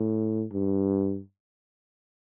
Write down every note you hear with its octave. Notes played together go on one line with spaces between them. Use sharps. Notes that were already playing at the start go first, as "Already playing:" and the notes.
Already playing: A2
G2